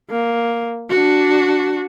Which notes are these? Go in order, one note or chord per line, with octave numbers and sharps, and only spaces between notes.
A#3
D4 F#4